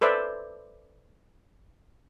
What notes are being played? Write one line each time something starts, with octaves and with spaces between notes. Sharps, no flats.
A4 B4 C5 D5 E5